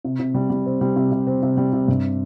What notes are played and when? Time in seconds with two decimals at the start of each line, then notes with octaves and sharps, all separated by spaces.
0.04 C3
0.19 C3
0.34 G3
0.50 G3
0.66 C4
0.81 G3
0.96 C3
1.12 C3
1.27 C4
1.43 C3
1.57 G3
1.73 C3
1.88 G2